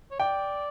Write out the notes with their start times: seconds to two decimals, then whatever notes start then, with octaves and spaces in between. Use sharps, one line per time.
0.11 C#5
0.20 D5 G5